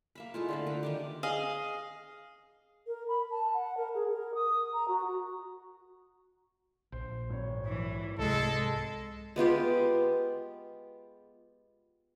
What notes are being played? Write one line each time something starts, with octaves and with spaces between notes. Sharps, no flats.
A#3 E5 B5
G#3 A3 E4 F4
D3 C5 B5
A#4 B4 F#5
D#3 D4 G4
G#4 D#5 F5
A#4
B5
A5
F#5
A#4
G#4
A#4
D#6
A#5
F#4
A#1 C5
G#1 C#5
E3
C2 G#3 A4
G#3 B3 F4 G4